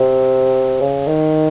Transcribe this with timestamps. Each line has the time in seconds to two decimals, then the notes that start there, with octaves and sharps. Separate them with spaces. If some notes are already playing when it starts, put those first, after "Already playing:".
Already playing: C3
0.81 C#3
1.07 D#3